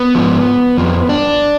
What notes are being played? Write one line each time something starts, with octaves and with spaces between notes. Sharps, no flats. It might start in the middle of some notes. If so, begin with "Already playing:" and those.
Already playing: B3
G#2 F3
F2 F3
D4